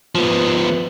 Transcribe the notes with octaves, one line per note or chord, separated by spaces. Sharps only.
F3 B3